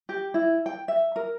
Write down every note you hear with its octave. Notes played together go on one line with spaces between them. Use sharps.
G4
E4
G5
E5
A#4